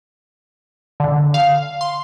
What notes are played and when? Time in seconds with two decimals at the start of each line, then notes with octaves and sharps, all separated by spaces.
1.00 D3
1.34 F5
1.81 C6